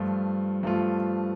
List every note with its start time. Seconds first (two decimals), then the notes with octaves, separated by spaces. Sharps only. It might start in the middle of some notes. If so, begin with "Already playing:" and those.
Already playing: G2 F3 A3 F4
0.63 G2 F3 A3 F4